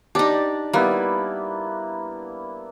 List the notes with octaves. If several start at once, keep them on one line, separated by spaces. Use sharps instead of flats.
D4 D#4 G4 D5 A5
G3 A#3 B3 E4